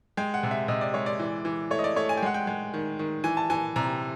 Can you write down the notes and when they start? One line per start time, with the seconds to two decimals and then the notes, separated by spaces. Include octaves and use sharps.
0.17 G#3 G5
0.34 F#5
0.43 C3
0.51 E5
0.68 C3 D#5
0.81 D5
0.94 G#3 C#5
1.06 D5
1.19 E3
1.45 E3
1.71 A3 C#5
1.79 D#5
1.84 D5
1.96 A3 C#5
2.09 G#5
2.17 G5
2.23 G#3 F#5
2.34 G5
2.47 G#3
2.74 D#3
2.99 D#3
3.24 E3 G#5
3.37 A5
3.50 E3 G#5
3.76 C3 A#5